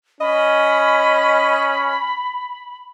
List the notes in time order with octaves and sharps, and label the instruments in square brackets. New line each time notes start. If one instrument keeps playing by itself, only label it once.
[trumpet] C#4 [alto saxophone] D#5 [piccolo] B5